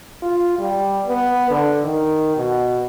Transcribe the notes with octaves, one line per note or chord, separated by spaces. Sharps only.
F4
G3
B3
D3
D#3
B2